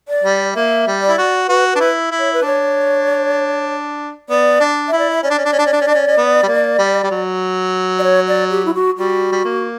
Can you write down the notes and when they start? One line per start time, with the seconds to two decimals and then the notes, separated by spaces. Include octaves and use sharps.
0.08 D5
0.24 G3
0.55 A#3 E5
0.87 G3
1.02 D5
1.09 E4
1.18 F#4
1.48 F#4 B4
1.72 D4 B4
1.80 E4
2.11 E4
2.19 C#5
2.33 B4
2.42 D4 C#5
4.29 B3 D5
4.60 D4
4.88 E4 E5
4.99 D5
5.11 E5
5.23 C#4 D5
5.30 D4
5.38 C#4
5.45 D4
5.52 C#4
5.59 D4
5.66 C#4
5.73 D4
5.81 C#4
5.87 D4
5.94 C#4
6.07 C#4
6.17 B3
6.43 G3
6.48 A#3
6.78 G3
7.03 G3
7.11 F#3
7.99 D5
8.04 C#5
8.28 D5
8.50 G4
8.66 E4
8.74 F#4
8.98 G3 F#4
9.32 G3
9.44 A#3